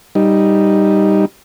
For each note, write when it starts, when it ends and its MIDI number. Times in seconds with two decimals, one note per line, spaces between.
0.15 1.25 55
0.15 1.25 63